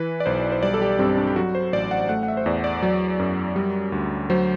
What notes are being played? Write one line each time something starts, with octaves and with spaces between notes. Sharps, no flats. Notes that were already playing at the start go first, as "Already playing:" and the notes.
Already playing: E3 B4
D5
B1 C5
C5
G3 D5
A4
G4
G2 C4
D4
G4
F#3 F#4
C5
A1 D5
F#5
A3 F#5
F#5
E5
C5
E2 D5
D5
F#3
F#2
G3
D2
F#3 C5